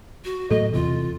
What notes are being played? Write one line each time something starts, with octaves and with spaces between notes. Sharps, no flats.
F#4
A2 F#3 A3 A4 D#5
E2 C3 E3 F4